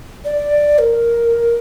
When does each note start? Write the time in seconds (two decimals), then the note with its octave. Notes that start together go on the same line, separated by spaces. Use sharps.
0.25 D5
0.79 A#4